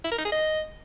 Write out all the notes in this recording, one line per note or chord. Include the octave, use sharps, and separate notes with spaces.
E4
A#4
D#4
G#4
D#5